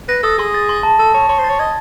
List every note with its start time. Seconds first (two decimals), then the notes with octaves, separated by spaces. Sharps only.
0.09 B4 A#6
0.23 A4 D#6
0.38 G#4 C6
0.54 A6
0.69 C6
0.83 A5
0.99 A4 A5
1.14 C#5 A5
1.29 C#5 C6
1.39 C5
1.44 A6
1.50 C#5
1.59 D#5 G#6